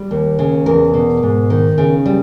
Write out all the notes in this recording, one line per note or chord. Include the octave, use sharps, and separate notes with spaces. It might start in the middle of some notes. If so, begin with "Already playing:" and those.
Already playing: G3
D#2
C#3
E2 A#4
B2
G#2
D#3
C#3
G3